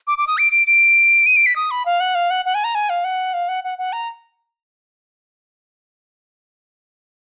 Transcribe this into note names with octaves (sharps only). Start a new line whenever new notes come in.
D6
D6
D#6
D7
D7
D7
D#7
D7
B6
D#6
B5
F5
F#5
F5
F#5
F#5
G#5
A#5
G#5
F5
F#5
F5
F#5
F#5
F#5
A#5